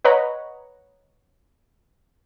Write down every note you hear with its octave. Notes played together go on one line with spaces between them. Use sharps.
B4 C#5 D#5 F#5 A#5 B5